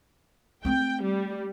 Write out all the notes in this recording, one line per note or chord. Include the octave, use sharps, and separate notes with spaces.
A3 C4 G5
G3